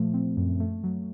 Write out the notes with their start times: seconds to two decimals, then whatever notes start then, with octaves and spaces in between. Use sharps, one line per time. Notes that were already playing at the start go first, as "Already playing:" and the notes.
Already playing: A#2 F3 A3
0.14 C4
0.37 F#2
0.60 A3
0.84 F#3